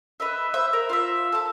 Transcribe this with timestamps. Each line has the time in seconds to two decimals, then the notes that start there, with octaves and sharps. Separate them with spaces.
0.20 B4 D#5 E5
0.54 C5 E5
0.73 A#4
0.89 F4 C5 E5
1.32 A4 A5